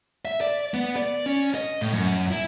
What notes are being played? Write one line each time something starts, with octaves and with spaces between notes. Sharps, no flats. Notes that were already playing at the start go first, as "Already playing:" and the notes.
E5
D5
B3
D5
C#4
D#5
A2
F#2
E4